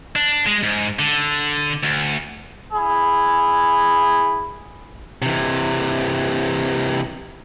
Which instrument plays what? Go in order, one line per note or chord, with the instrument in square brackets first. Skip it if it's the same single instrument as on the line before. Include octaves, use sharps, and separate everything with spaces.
[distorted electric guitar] D4
G#3
G#2
D3
D2
[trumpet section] E4 G#4
[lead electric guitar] C3 E3